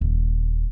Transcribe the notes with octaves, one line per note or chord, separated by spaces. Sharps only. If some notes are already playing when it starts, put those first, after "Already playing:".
D#1